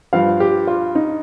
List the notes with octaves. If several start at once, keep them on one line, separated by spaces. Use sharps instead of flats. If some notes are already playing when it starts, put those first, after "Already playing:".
G2 F3 F5
G4
F4
D#4